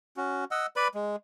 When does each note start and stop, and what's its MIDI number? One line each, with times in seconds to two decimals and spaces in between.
0.17 0.45 61
0.17 0.45 66
0.51 0.67 75
0.51 0.67 78
0.51 0.67 88
0.76 0.88 71
0.76 0.88 74
0.76 0.88 83
0.95 1.16 56